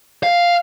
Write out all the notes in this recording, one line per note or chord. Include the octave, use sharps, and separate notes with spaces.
F5